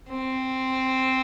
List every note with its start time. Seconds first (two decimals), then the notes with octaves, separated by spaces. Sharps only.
0.10 C4